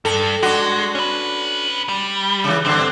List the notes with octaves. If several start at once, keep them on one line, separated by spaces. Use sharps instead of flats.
G2 A4
G#3 D4 F#4
C#4 B4
G3
C#3 E3
G2 D3 C4